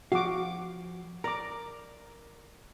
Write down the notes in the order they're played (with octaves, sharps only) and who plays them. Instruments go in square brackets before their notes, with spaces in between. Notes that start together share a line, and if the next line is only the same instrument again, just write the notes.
[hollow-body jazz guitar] F3 G#4 F5 [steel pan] F#4 D6
[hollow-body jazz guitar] A#4 D5 [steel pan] A#5 D6